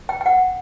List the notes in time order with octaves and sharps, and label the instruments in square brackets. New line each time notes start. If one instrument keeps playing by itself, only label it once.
[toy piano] G5
G5
F#5